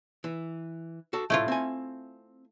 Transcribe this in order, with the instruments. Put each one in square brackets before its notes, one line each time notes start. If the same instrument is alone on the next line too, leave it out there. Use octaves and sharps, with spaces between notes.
[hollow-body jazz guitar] E3
F#4 A4
[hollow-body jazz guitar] C2 A2 [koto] A3 E4 F4
[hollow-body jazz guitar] C4 G#5